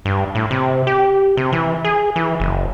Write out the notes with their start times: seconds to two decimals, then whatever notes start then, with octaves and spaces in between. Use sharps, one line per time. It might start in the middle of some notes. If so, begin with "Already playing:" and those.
0.05 G2
0.35 A2
0.51 C3
0.87 G4
1.37 C3
1.52 E3
1.84 G#4
2.16 E3
2.40 F#1